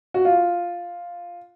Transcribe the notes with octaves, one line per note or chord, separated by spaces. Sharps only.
F#4
F4